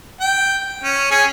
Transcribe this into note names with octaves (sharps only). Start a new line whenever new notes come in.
G5
C#4
C#4 G#4